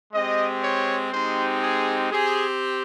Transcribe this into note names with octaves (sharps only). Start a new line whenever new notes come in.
G#3 C4 G4 D#5
C#5
G#3 C4 D#4 G4 C5
G#4
C4 G4 G#4